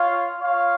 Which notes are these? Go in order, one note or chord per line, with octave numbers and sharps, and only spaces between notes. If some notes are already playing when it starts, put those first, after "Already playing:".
Already playing: F4 C#5 F5
F4 C#5 F5